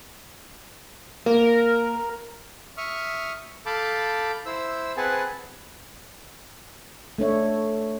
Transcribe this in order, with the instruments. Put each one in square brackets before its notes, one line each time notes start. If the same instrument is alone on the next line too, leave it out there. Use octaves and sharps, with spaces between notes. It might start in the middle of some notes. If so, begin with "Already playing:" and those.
[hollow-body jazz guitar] A#3 [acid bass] A#4
[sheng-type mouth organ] E5 C#6 D#6 F6
A4 F5 A5 B5 D6 G6
E4 C5 E6
C4 G#4 B4 F#5 G#5 A5
[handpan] A3 D4 C#5 E5